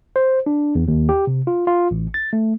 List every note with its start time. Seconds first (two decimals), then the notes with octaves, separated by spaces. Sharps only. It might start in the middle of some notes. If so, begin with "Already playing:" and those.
0.16 C5
0.46 D4
0.75 E2
0.88 D#2
1.09 G4
1.27 C3
1.47 F4
1.67 F4
1.91 A1
2.14 A6
2.33 A3